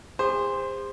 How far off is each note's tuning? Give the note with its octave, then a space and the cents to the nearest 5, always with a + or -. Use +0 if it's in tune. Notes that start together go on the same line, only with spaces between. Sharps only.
G#4 -45 C5 +0